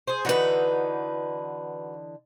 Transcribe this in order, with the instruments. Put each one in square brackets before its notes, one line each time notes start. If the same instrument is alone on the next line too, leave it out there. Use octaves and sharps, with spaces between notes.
[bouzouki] G#4 C5
[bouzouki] D3 E3 D#4 [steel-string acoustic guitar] F#4 B4